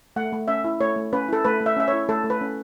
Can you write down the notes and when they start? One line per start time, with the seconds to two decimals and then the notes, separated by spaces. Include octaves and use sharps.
0.16 A3 F#5
0.33 A3
0.48 C#4 E5
0.64 E4
0.80 A3 C#5
0.96 A3
1.13 C#4 B4
1.29 E4 A4
1.45 A3 B4
1.61 A3
1.66 E5
1.76 C#4 E5
1.88 E4 C#5
2.09 A3 A4
2.24 A3
2.30 B4
2.41 C#4